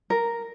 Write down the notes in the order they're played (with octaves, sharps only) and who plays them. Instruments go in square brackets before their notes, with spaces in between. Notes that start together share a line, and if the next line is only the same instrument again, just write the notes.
[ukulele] A#4